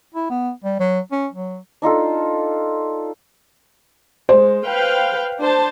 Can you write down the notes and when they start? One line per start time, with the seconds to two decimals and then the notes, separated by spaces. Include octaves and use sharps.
0.14 E4
0.30 B3
0.64 G3
0.80 F#3
1.12 C#4
1.33 F#3
1.82 D4 D#4 F4 A4
4.29 G#3 C5
4.64 B4 F5 G5
5.40 D4 C5 A5